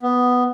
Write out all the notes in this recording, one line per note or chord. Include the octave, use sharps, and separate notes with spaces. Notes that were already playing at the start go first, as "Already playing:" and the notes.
B3